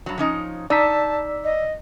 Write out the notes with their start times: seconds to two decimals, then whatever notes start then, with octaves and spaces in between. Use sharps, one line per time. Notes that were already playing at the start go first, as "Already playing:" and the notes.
0.06 G2 F#3
0.18 F3 C#4 D#4
0.70 D#4 D5 A5 E6 B6
1.44 D#5